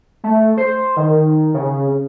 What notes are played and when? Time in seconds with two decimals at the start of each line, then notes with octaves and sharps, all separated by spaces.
0.24 A3
0.57 C5
0.97 D#3
1.54 C#3